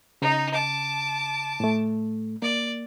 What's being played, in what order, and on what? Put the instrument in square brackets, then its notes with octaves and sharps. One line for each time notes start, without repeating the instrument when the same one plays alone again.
[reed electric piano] C#3 [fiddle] D#4
[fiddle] A5 D6
[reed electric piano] A2 A3
[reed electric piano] A#3 [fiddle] D5